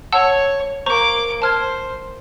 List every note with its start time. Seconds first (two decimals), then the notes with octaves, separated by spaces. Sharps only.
0.12 C#5 F#5 A5 E6
0.86 A#3 C5 A#5 C#6 D6
1.42 C5 A5 F6 G#6